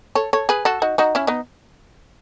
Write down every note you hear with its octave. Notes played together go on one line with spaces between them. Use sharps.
A4 C#5
A4 C#5
G#4 B4
F#4 A4
D#4 F#4
D#4 F#4
C#4 E4
B3 D#4